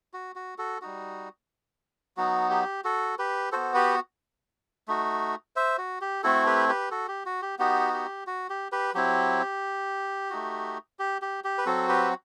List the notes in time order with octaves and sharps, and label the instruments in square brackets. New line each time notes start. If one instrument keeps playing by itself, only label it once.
[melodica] F#4
F#4
F#4 A4
G3 D#4 F#4
F#3 B3 D#4 F#4
G4
F#4 A4
G4 B4
B3 F#4 A4 C5
G4 B4
A3 D#4 F#4
C5 E5
F#4
G4
A3 C4 E4 F#4 A4
G4 B4
G4 B4
F#4 A4
G4
F#4
G4
B3 D#4 F#4 G4
G4
F#4
G4
G4 B4
F#3 C4 E4 G4
A3 D#4 F#4
G4
G4
G4
B4
F#3 C4 F#4 A4
G4 B4